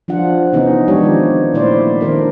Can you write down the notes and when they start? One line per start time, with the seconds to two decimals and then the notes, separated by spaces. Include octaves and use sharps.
0.08 F3 D4 F4 F#5
0.53 C3 E3 B3 C#4 D#4 G#4
0.88 F3 G#3 D4 D#4 G4 C#5
1.03 D#3 C4
1.53 A#2 A3 E4 C5 D5
2.01 D#3 D4 A#4 C5